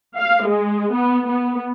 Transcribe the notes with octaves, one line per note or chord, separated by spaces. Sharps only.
F5
G#3
B3
B3